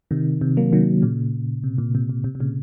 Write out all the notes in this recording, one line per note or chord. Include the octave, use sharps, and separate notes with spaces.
C3 D#3
C3
F#3 A#3
D#3 F#3
A#2 C#3
C3
A#2
C3
A#2
C3
C3
A#2 C#3